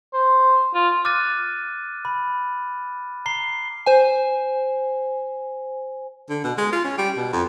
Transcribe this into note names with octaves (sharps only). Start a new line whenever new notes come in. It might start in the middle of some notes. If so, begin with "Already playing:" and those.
C5
F4
D6 F6 F#6 A6 D#7
B5
A#5 C7 G7
C5 G#5
D3
B2
G#3
F4
C#4
G3
B2
F2